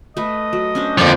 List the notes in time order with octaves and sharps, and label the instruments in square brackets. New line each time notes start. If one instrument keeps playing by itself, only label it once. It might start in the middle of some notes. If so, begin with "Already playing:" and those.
[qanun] A3 B4 [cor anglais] D#5
[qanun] F#3
C#4 D4 C5
[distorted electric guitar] F2 F3 [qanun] D3 A#3 F5 [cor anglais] D5